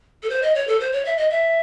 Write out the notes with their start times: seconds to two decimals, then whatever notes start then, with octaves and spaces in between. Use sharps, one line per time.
0.23 A4
0.29 C5
0.42 D#5
0.55 C#5
0.68 A4
0.80 C5
0.92 C#5
1.05 E5
1.17 D#5
1.30 E5